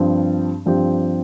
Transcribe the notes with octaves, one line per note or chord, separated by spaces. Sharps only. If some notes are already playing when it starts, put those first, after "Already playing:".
Already playing: G2 F3 C4 G4
G2 F3 C4 G4